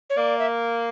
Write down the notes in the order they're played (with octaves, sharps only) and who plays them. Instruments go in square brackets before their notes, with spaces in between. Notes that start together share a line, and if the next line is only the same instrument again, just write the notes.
[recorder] C#5
[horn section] A#3 [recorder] D5
[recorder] E5